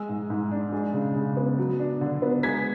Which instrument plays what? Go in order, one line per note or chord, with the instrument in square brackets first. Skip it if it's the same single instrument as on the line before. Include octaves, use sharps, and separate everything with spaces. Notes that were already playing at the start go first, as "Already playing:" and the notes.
Already playing: [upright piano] G#3 E6
G#2
G#2
D4
G#3
C#3
C#3
B3
F#3
D4
D3
B3
G#3 G#6 B6